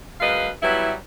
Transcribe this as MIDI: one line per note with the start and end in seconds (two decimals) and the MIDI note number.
0.20 0.49 42
0.20 0.49 56
0.20 0.49 71
0.20 0.49 75
0.20 0.49 77
0.61 0.92 54
0.61 0.92 55
0.61 0.92 59
0.61 0.92 64